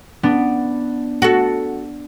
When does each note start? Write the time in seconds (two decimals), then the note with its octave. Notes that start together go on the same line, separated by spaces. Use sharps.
0.23 B3 D4
1.22 F#4 A4